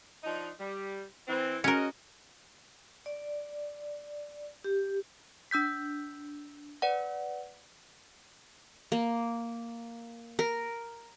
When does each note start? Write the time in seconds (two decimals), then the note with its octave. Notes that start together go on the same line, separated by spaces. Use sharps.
0.24 F3 D4 D#4
0.60 G3
1.28 E3 C4
1.64 C#4 F#4 A#4 D#5
3.06 D5
4.64 G4
5.51 D4 E6 G6 B6
6.82 B4 D5 F#5
8.92 A#3
10.39 A#4